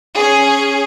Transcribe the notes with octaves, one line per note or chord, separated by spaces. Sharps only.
C#4 G#4